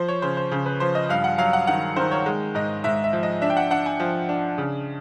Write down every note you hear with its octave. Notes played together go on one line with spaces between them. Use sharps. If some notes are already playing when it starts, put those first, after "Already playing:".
Already playing: F3 C5
C#5
C#3 C5
C5
C#3
B4
F3 C5
D#5
G2 F5
F#5
F#3 F5
F#5
D#3 F#5
D#3 C5
C#5
G#3
G#2 D#5
G#2 E5
E5
F3
D#5
D4 E5
G5
F#5
D4 F#5
G#5
F3
D4
C#3